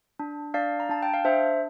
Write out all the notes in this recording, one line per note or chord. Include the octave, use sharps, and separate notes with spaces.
D4
D4 D5 F5
A#5
D4 A5
G5
F5
D4 C5 E5